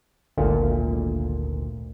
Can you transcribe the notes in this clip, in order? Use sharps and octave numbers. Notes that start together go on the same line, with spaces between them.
G#1 D2 A#2